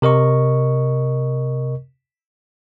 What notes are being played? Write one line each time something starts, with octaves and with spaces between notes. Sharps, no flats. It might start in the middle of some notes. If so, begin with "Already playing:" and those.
C3 A#4 D#5 C#6